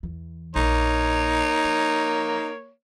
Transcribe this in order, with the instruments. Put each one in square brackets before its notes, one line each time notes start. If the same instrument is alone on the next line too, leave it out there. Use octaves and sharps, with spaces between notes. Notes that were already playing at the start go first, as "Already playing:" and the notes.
[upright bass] E2 E3
[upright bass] A#1 [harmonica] A#3 C#5 [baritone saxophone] D#4
[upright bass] F3